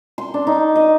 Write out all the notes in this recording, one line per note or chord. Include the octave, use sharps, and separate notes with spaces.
C6
D4
D#4
D#5